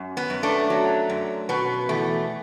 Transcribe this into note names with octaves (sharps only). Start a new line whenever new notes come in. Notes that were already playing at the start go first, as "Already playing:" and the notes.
Already playing: F#2
B3
F#2
A3 D4
F#3
F#2
B2 B3
E2 A3